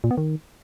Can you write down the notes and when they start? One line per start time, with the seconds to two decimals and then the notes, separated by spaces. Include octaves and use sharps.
0.04 A#2
0.11 B3
0.17 D#3